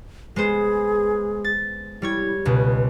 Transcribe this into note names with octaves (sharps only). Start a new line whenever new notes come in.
G#3 B3 G#4 C5
A6
G3 E4 C#5 G#6
C#2 B2 B4